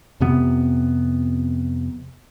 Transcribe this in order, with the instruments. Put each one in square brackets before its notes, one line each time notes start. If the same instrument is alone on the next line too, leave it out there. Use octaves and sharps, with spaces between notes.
[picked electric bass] F2 C3 B3